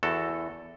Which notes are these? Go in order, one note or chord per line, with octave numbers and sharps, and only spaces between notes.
E2 F#4 A4